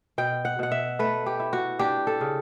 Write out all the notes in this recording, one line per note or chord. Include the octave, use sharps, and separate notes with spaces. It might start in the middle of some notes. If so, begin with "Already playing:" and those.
B2 G5
F#5
B2 F#5
E5
A3 B4
G4
E4
F#4
D4 G4
A4
C#3